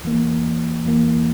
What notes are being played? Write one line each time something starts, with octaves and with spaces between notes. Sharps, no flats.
E2 E3 A#3
E2 E3 A#3